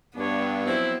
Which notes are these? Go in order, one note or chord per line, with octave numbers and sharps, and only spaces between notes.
G2 B3 D4 C#5
F3 F#3 C4 E4